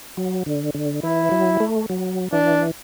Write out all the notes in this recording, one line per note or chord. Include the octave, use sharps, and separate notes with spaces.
F#3
D3
D3
E3 E4
F#3
A3
F#3
E3 D4